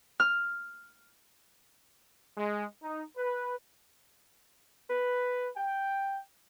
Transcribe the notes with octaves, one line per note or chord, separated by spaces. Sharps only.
F6
G#3
D#4
B4
B4
G5